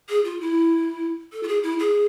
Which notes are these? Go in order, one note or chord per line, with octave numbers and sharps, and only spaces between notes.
G#4
F4
E4
A4
F4
G#4
E4
G#4